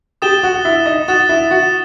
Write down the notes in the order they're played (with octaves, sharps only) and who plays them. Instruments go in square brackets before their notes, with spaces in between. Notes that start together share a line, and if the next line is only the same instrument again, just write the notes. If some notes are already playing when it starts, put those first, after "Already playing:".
[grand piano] G4 G5 [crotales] D#6 A6 E7 G7
[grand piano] F#4 F#5
E4 E5
D#4 D#5
[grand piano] F#4 F#5 [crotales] D#6 A6 E7
[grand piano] E4 E5
F#4 F#5